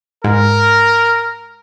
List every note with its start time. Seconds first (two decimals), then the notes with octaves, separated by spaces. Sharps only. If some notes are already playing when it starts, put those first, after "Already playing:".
0.24 G#2 A#4